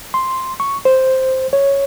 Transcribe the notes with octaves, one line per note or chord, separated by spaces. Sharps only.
C6
C#6
C5
C#5